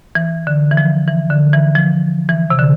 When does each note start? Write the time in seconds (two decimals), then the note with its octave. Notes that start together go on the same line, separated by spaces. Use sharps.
0.15 E3
0.47 D3
0.71 E3
0.77 F3
1.08 E3
1.30 D3
1.53 E3
1.75 F3
2.29 E3
2.50 C3
2.59 D3